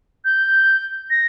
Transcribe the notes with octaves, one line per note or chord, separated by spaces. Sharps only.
G6
A#6